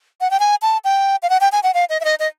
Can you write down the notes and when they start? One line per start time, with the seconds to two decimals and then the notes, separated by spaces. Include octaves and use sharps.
0.21 F#5
0.31 G5
0.40 G#5
0.62 A5
0.84 G5
1.23 F5
1.30 F#5
1.41 G5
1.52 G#5
1.63 F#5
1.74 F5
1.90 D#5
2.00 E5
2.05 D#5
2.20 D#5